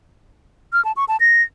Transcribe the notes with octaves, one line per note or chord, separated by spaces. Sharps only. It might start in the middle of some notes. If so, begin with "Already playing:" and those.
F6
A5
C#6
A5
A#6